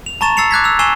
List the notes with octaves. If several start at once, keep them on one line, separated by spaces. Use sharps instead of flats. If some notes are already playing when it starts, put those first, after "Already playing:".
F7
A5 A#5 C#6 A6 E7
E6 A6 C7 C#7 F7
D6 F#6 G#6 B6
E6 F7
G#5 C#6 E6 C7 E7 G7